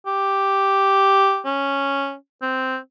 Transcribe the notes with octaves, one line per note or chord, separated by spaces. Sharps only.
G4
C#4
C4